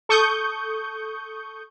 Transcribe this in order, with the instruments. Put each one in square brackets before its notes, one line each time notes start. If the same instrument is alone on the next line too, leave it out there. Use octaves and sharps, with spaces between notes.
[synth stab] A4 C#6 D#6 G6